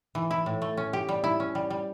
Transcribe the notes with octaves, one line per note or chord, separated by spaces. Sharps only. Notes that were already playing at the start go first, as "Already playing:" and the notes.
E3
E4
A2
A3
C#4
G4
G3
E4
C#4
G3
G3